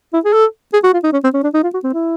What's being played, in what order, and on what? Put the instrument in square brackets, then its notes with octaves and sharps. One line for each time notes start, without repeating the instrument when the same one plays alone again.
[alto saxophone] E4
G#4
A4
G#4
F#4
F4
D#4
C#4
C4
C#4
D4
D#4
F4
F#4
C4
E4